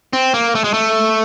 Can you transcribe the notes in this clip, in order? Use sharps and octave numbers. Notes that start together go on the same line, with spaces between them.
C4
A#3
A3
G#3
A3